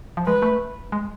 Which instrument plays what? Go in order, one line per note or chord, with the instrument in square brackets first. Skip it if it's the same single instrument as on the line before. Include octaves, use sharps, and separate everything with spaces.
[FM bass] F3
[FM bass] G#3 [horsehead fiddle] B4
[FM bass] A3
G#3